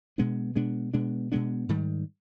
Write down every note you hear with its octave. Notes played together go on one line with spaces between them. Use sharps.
B2 G#3 B3 D4
B2 G#3 B3 D4
B2 G#3 B3 D4
B2 G#3 B3 D4
G#2 D#3 G3